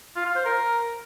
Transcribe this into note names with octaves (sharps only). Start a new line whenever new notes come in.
F4
F5
C5
A#4